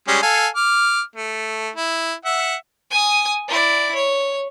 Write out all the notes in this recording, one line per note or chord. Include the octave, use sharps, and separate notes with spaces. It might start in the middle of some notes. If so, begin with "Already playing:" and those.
G3 G#3 C#4
A4 F5 G#5
D6 F6
A3
E4
E5 F#5
G#5 D#6
E4 D5
C#5